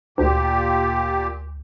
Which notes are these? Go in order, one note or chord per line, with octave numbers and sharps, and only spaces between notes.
D2 A#2 G4